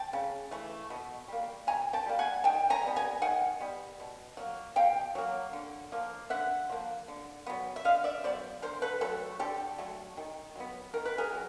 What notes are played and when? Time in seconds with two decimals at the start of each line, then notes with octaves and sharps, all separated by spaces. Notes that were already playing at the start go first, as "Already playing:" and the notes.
Already playing: G5 A5
0.13 C#3
0.51 E3 A3
0.90 B2
1.28 G3 A#3
1.67 B2 G#5 A#5
1.93 G5 A5
2.06 G3 A#3
2.19 F#5 G#5
2.44 D#3 G5 A5
2.70 G#5 A#5
2.83 G3 B3
2.96 G#5 A#5
3.22 D#3 F#5 G#5
3.60 G3 B3
4.00 B2
4.37 F#3 A#3
4.76 B2 F5 G5
5.15 F#3 A#3
5.53 D3
5.92 F3 A#3
6.30 D3 E5 F#5
6.69 F3 A#3
7.08 D3
7.46 F#3 B3
7.76 E5
7.85 D3 D#5 F5
8.04 D5 E5
8.24 F#3 B3 C5 D5
8.62 D3 A#4 C5
8.82 A4 B4
9.01 F#3 A4 B4
9.05 A3
9.39 D3 G4 A4
9.78 F#3 A3
10.17 D#3
10.55 F#3 B3
10.94 D#3 A#4
11.05 B4
11.18 G#4 A#4
11.33 F#3